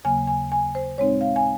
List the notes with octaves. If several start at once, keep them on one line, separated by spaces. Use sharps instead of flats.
D#2 C#3 F#3 A#3 G#5
G#5
G#5
C5
A#2 G#3 C4 D#4 C#5
F5
G#5